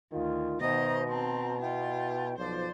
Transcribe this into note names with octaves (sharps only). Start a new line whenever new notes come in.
D2 D#3 F4
B2 D#3 C5 D#5 E5 A#5
C4 A5 A#5 C6
E4 F4 G5
B1 F3 C5 D5